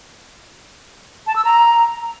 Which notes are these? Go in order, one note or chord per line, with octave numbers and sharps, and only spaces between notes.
A5
E6
A#5